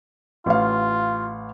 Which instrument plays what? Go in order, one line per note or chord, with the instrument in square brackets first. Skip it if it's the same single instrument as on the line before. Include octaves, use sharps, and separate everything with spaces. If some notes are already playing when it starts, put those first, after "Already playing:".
[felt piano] A1 F5 [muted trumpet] F4